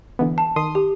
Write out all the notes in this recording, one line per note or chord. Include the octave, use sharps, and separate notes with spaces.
D3 E3 B3
A5
D#3 C6 D#6
G4